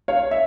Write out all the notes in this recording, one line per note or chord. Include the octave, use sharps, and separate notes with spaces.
C#5 F5
E5